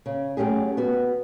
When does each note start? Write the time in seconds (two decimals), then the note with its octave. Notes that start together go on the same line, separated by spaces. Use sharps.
0.06 C#3
0.37 F#3 A3 C#4 G4 G#4
0.77 B3 F#4